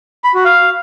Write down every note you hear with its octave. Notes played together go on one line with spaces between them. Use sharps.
B5
F#4
F5